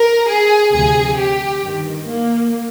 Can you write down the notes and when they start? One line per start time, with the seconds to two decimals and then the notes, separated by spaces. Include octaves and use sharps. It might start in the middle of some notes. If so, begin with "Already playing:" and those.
Already playing: A#4
0.27 G#4
0.72 D2 C3 F3 G#4
1.17 G4
1.63 G2 D#3
2.08 A#3